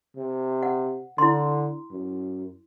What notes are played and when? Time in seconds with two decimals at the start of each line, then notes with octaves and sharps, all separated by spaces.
0.17 C3
0.62 F#5
1.18 D3 E4 C6
1.92 F#2